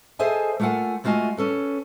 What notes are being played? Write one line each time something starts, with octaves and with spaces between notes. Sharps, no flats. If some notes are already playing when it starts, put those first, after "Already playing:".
G#4 A4 C5 D#5 E5 G#5
A3 A#3 F4 A4 F#5 G#5
G#3 A3 F4 F#4 D#5 G#5
C#4 A4 B4